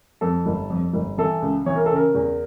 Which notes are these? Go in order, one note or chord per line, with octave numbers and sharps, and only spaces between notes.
F2 A4
G1
F2
G1
E3 A4
C#2
E3 C#5
A#4
A4
C#3 A#4
E2